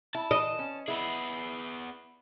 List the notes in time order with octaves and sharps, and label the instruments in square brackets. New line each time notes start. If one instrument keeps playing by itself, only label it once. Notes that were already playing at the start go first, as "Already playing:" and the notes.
[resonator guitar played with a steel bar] E4 [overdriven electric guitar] A5
[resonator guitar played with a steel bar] E3 [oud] D#5
[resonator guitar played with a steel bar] C#4
[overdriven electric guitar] B3 G#4 [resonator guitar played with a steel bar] E4